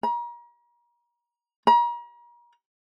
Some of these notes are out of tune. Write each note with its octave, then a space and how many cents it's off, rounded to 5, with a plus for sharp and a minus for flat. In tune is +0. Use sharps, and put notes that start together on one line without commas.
A#5 +35
A#5 +40